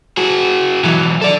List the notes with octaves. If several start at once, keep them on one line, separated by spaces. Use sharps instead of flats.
F#4 G#4
E3 F#3
A4 D5